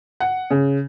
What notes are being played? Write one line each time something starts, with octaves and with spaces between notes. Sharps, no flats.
F#5
C#3